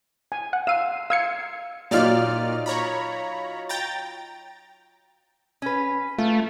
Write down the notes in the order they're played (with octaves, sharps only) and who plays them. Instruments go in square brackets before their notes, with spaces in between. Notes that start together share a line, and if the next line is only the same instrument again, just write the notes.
[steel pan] G#5
[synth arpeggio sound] F#5
[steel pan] F5 [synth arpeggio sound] E6 D#7
[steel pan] F5 [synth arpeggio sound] E6 G#6 C#7
[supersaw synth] A#2 D5 F6 [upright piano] F#3 D#4 F4
[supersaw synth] C#5 A#5 B5
G5 A#5 A6
[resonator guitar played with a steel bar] C#4 B4
[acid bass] A3 [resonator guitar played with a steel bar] F4